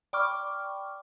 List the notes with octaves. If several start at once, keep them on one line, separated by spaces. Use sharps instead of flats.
D5 G5 B5 C#6 D6 F6